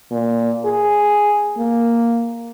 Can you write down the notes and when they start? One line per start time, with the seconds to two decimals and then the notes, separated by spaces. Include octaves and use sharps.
0.11 A#2
0.65 G#4
1.58 A#3